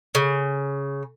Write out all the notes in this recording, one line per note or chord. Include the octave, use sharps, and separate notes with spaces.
C#3